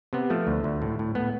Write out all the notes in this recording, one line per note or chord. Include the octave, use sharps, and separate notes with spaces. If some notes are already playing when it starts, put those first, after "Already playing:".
C3 B3
F3 A3
D2
D2
A2
A2
A2 B3